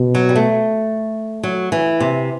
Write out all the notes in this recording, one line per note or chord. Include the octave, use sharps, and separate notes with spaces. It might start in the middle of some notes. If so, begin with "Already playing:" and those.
Already playing: B2
F#3
G3
A3
F#3
E3
C3